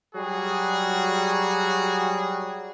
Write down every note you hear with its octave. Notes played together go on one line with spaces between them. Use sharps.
F#3 G3 F#4 G#4